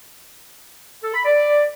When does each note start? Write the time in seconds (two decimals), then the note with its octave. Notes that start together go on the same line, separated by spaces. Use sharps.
1.02 A4
1.14 B5
1.25 D5